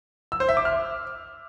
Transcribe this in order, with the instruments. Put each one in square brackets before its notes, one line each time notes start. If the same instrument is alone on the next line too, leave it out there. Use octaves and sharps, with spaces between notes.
[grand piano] E6
C5
E5
D6
F6